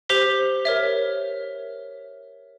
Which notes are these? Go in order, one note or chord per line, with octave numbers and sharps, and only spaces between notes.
G4 C5 B6 G7
A#4 C#5 E5